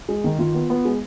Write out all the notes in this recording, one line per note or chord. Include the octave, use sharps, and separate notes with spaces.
G#3
D#3
D#3 F4
B3
B3
G#3